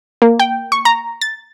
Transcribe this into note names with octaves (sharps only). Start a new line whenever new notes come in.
A#3
G5
C#6
A#5
A6